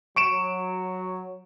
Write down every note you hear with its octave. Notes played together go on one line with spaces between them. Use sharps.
F#3 C#6 D7 E7